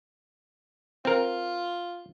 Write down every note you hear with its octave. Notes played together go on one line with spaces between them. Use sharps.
C4 F4 A#4